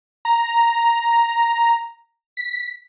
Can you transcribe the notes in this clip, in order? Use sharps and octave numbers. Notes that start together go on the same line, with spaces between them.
A#5
B6